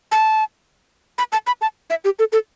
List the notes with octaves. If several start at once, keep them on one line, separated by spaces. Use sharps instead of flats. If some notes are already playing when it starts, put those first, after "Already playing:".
A5
B5
A5
B5
A5
E5
G4
A4
A4